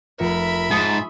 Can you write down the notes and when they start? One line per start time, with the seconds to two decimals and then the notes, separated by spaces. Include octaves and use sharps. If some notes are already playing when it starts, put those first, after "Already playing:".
0.19 F1 F4 A#4 E5 B5 C#7
0.71 G#2 A5 C#6 D#6 E6